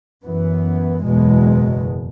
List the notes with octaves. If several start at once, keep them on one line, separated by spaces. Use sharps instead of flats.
F#2 E3 B3
F#1 E2 B2 G#3